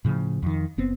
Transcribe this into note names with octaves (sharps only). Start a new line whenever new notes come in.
A2 C#3 F3
F2 D#3
F#1 B3 C4